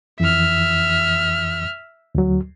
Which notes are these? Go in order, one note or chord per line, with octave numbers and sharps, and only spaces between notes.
F2 E3 E5 F6
D2 F#3